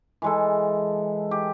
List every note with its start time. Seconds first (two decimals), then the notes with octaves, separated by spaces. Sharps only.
0.22 E3 G#3 A4
1.31 G4